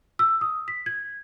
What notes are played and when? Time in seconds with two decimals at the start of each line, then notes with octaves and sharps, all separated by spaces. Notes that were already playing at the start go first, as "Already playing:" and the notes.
0.19 E6
0.41 D#6
0.68 B6
0.86 G#6